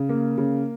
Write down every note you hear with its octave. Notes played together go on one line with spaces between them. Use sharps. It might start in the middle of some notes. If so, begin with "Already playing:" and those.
Already playing: C#3
A#3
C#3